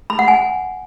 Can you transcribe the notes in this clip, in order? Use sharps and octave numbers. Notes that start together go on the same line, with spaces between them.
B5
F#5
G#5